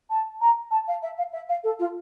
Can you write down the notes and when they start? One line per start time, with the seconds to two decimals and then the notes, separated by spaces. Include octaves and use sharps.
0.09 A5
0.40 A#5
0.70 A5
0.87 F5
1.02 E5
1.17 F5
1.32 E5
1.48 F5
1.63 A4
1.79 F4